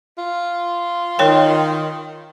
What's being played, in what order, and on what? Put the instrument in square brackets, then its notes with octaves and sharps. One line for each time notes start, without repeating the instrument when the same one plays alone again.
[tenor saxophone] F4
[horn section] D#3 [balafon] A#4 C#5 G5